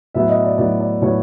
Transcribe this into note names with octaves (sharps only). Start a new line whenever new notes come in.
A2 F#3 B3 E5
D#5
D5
A2 F#3 B3 D5
D5
A2 F#3 B3 C#5